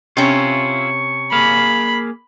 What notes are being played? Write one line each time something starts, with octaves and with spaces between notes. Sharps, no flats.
C3 C#4 E4 F4 C#6
A#3 G#4 F5 B5